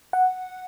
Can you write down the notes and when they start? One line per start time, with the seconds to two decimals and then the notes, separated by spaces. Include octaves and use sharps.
0.13 F#5